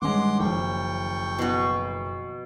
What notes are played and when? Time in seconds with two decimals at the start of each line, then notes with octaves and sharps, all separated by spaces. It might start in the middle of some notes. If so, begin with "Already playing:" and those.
0.02 G2 D#3 G#3 C#4 F#5 C6 D6
0.40 F#1 F3 A4 G5 C#6
1.39 B2 F#4